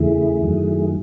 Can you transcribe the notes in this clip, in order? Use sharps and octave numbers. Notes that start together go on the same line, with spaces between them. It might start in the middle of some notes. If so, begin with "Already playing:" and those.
Already playing: E2 C#3 E3 A3 E4 G#4
F#2 D#3 F#3 A3